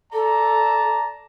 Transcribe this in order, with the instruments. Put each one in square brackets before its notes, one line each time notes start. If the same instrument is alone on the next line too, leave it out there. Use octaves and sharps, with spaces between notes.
[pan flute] A4 [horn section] D5 A5 A#5